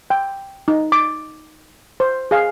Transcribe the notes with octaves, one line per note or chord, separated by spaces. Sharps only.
G5
D#4
D6
C5
G#4 F5